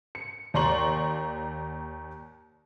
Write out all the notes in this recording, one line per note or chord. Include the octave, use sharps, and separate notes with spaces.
C#7
D#2 D5 A#5 C6 C#6 F#7